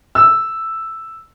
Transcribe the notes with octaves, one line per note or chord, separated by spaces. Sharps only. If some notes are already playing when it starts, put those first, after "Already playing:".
E6